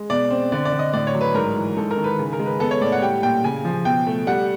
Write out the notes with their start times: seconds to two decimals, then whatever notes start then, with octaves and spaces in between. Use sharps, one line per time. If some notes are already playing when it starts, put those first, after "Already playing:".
Already playing: G#3
0.10 B2 D5
0.30 C4
0.52 D3 D5
0.65 D5
0.72 D3
0.79 D#5
0.94 A2 D5
1.07 C#5
1.15 F#3
1.21 B4
1.34 G#2 A#4
1.56 E3
1.77 G#2 A4
1.91 A#4
1.97 D#3
2.04 B4
2.19 C#3
2.33 A#4
2.40 G#3
2.46 B4
2.60 B3 A4
2.71 C#5
2.81 A2 D5
2.92 F#5
3.02 G3 G5
3.23 A#2 G5
3.44 C#3 G#5
3.65 F3
3.85 B2 G5
4.07 A3
4.27 G3 F#5